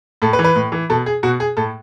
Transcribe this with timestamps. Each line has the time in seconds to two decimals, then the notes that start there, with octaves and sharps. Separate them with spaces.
0.22 A2 A4
0.33 B4
0.39 E3
0.44 B4
0.55 A2
0.72 E3
0.90 B2 A4
1.06 G#4
1.23 B2 F#4
1.40 G#4
1.57 A2 A4